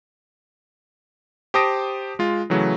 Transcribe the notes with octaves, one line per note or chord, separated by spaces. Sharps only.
G4 C5 A5 D#6 A#6 D7
G#3 F4
C#3 E3 F#3 A3